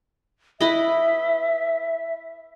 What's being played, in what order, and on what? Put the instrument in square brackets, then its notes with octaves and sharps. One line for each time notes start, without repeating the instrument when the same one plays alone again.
[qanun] E4 B4 D#5 [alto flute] E5